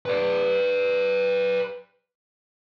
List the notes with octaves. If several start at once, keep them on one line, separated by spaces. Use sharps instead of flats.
B4 D5